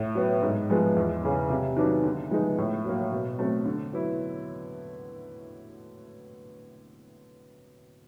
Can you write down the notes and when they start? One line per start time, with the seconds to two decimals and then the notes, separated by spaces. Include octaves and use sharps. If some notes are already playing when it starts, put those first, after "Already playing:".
Already playing: A2
0.15 F#3 B3
0.42 G#2
0.70 F3 G#3 B3
0.96 E2
1.23 C#3 E3
1.50 C3
1.76 D#3 F#3 B3 D4
2.03 D3
2.30 F3 G#3 B3 D#4
2.58 A2
2.85 F#3 A#3
3.12 B2
3.39 F#3 A3 C4
3.65 D3
3.93 F#3 B3 E4